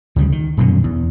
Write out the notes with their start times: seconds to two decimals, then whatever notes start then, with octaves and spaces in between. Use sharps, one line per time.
0.16 D2 C#3 F3 G3
0.32 D#3
0.57 D#1 F#2 B2 D3
0.84 E2